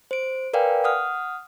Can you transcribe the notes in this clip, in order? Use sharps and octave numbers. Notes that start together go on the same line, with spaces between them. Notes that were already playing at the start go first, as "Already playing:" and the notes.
C5 D7
A#4 B4 D5 F5 G5 G#5
F#5 D#6 F6